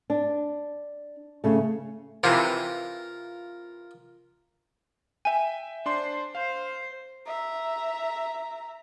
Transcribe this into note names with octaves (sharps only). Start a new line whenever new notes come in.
D4
C#3 A3
C3 E3 F4 A#4
E5 G5 G#5
D4 C5 C6
C5 F5
E5 A#5